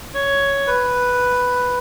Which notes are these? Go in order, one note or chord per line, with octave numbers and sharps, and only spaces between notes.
C#5
B4